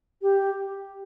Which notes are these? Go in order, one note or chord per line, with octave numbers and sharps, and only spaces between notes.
G4